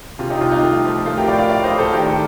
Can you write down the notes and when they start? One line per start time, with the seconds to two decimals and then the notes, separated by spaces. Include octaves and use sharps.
0.19 C3 F4
0.30 D#4 G4
0.41 C2 F4
0.52 D#4
0.63 A3
0.85 F3
1.06 A3 F4
1.17 G4 A#4
1.28 A2 D5 F5
1.38 D5 F5
1.50 A3 D5 F5
1.64 C5 D#5
1.72 A2
1.79 A4 C5
1.93 D#3 G4 A#4
2.10 A4